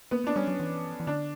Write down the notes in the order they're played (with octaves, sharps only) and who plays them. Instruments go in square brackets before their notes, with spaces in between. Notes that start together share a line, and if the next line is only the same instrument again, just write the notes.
[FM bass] A#3 [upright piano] B3
[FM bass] A#3 [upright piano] D4
[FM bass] G3 [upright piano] C#4
[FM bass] F#3
E3
E3
[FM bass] D3 [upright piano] D4